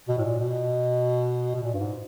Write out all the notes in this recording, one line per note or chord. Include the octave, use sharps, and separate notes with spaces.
B2
A2
A#2
B2
B2
A#2
G2
G#2